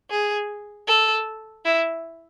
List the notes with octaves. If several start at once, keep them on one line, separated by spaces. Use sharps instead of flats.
G#4
A4
E4